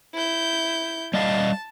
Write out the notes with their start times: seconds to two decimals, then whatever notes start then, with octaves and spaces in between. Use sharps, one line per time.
0.14 E4 G6
1.14 G3 D#5 F5 A5